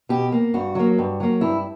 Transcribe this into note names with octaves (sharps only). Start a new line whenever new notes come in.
B2 G4
A#3
G2 F#4
F#3 A#3
G2
F#3 A#3
G2 E4